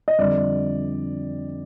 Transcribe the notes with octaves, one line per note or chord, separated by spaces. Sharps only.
D#5
F2 D3 G3 D5